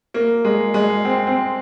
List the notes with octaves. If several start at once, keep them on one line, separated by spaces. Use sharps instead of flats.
A#3
G#3
G#3
C4
C4